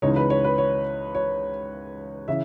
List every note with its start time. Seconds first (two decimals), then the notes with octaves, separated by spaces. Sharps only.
0.02 C#2 C#3 E3 G#3 D#4 C#5
0.16 B4
0.30 C#5
0.44 B4
0.58 C#5
1.15 C#5
2.28 C#3 E3 E5